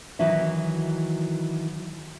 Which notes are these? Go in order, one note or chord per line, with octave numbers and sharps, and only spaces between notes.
D#3 E3 F#3 F#4 E5